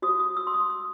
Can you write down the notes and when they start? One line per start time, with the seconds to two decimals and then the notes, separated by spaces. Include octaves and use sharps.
0.02 F#4 C5 D#6
0.19 D#6
0.37 E6
0.47 C6
0.53 D#6
0.70 E6